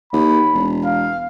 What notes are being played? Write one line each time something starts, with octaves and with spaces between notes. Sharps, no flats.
D#2 B5
E1
F5